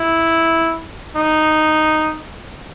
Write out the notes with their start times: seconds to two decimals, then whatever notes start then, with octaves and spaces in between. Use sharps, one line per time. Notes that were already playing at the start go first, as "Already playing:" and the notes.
Already playing: E4
1.16 D#4